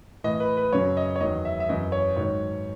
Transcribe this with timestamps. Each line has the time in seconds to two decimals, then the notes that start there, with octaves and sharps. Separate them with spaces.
0.24 A2 E3 D#5
0.40 B4
0.57 B4
0.72 F#2 C#3 F#3 C#5
0.97 D#5
1.16 C#5
1.20 E2 D#3 F#3 D#5
1.45 E5
1.60 E5
1.69 F#2 E3 D#5
1.92 C#5
2.16 G#2 D#3 F#3 C#5